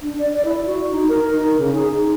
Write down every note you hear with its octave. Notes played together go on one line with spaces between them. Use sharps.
D4
D5
D5
E4
F#4
D#4
A#4
D#4
C#3
G#4
D#4